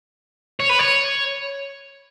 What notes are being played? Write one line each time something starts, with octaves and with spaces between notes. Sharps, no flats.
C#5
B4
C#5